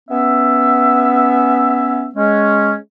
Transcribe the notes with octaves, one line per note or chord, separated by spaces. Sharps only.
B3 C#4 E5
G#3 C#4